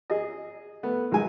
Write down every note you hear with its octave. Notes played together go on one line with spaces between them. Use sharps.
G#4 D#5
A3 B3
B1 D#3 G#3 G#4 G#5